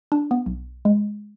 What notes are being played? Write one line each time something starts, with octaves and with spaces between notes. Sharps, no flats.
D4
B3
B1
G#3